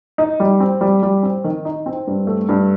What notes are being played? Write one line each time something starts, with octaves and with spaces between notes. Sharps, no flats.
D#4
G3
C4
G3
G3
C4
D#3
D#4
C4
G2
A3
G2